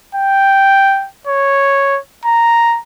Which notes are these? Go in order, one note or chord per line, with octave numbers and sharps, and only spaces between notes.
G5
C#5
A#5